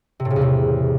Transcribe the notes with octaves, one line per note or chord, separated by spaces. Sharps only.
C3
A2
C#3
E2
C3